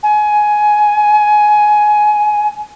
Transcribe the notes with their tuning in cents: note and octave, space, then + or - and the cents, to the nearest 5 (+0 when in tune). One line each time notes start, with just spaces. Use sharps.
G#5 +15